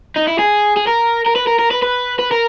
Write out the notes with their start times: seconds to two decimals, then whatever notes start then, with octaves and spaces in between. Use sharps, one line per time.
0.16 D#4
0.27 E4
0.39 G#4
0.76 G#4
0.87 A#4
1.26 A#4
1.36 B4
1.47 A#4
1.59 A#4
1.71 B4
1.83 B4
2.19 B4
2.31 A#4